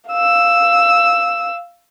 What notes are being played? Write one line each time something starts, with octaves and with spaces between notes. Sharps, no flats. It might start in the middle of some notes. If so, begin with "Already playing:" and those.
F5 E6